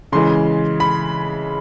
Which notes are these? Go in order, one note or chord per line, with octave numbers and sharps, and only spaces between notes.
C#3 E3 G#3 C6
B5